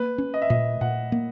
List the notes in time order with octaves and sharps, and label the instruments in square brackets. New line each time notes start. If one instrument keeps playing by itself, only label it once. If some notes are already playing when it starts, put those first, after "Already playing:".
Already playing: [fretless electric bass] A#3 [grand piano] B4
[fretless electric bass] C#4
[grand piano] D#5
E5
[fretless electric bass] A#2 [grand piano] D#5
[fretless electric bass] A#2 [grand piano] F#5
[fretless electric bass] A#3